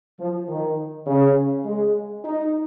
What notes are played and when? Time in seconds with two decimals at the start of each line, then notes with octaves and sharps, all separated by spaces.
0.19 F3
0.49 D#3
1.07 C#3
1.65 G#3
2.24 D#4